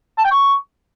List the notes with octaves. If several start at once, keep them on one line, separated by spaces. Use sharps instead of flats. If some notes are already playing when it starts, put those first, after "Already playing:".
A5
G5
C#6